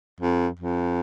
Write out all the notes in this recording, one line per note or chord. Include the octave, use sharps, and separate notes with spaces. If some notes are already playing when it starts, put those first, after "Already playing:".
F2
F2